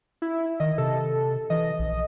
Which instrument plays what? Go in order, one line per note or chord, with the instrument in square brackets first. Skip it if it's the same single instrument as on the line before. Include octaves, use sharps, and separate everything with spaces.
[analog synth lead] E4
[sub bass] D#3 [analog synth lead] D#5
[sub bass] C3 [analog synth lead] A4
[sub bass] E3 [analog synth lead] D#5
[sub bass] A#1